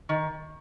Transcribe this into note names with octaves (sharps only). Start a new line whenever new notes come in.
D#3